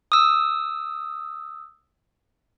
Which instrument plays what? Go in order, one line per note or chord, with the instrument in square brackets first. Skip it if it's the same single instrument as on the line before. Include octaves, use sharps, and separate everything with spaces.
[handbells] D#6 E6